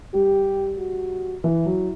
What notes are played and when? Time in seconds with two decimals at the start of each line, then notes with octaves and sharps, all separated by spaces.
0.14 G3 G4
0.79 F#4
1.44 E3 E4
1.66 F#3